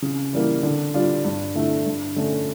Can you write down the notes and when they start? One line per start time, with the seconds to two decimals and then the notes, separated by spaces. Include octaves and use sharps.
0.02 C#3
0.33 E3 G3 A#3
0.63 D3
0.94 G3 D4 F4
1.25 G2
1.55 D3 A3 E4
1.85 G2
2.16 D3 A3 C#4